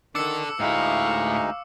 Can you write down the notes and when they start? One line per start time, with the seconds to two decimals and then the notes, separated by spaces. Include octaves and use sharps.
0.15 D#3 D4 A4 D6 E6 C#7
0.60 D2 A2 G#3 D#4 E4 F5 C#6